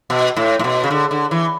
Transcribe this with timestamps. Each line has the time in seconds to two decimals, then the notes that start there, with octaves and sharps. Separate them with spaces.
0.10 B2
0.36 A2
0.59 A2
0.64 B2
0.84 C#3
0.91 D3
1.11 D3
1.31 E3